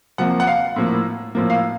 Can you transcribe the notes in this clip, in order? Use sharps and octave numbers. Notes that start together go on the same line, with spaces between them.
C3 F3 A#3 F#5
F#5
F5
A2 F3 A#3
A2 F3 A#3
F5